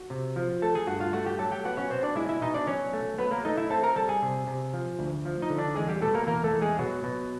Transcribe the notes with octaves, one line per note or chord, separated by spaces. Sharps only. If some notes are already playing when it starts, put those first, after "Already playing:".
Already playing: F#4
C3
F3
A3 A4 A5
G#4 G#5
G2 F#4 F#5
F4 F5
A3 F#4 F#5
G4 G5
F#3 A4 A5
G4 G5
B3 F#4 F#5
C#4 C#5
B2 C4 C5
D4 D5
G#3 E4 E5
E4 E5
B2 D#4 D#5
D4 D5
F#3 C#4 C#5
A3
F#3 B3 B4
A#3 A#4
A3 D#4 D#5
E4 E5
C4 A4 A5
A#4 A#5
G3 A4 A5
G#4 G#5
C3
C3
F3
D2
F3
D#4 D#5
D3
D4 D5
E2 G#3 G#4
G3 G4
B2 A3 A4
A#3 A#4
E2 A#3 A#4
A3 A4
E2
G#3 G#4
B2 F#3 F#4
B2